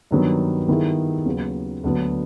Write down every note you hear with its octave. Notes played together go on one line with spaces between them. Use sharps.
G2 D#3 F#3 B3
D#3 G3 B3 E4 G#4
D#2 C#3 F#3 B3
D2 D3 F#3 B3